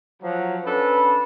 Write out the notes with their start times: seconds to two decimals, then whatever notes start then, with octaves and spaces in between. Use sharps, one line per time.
0.23 F3 F#3
0.65 C#4 D4 A4 B4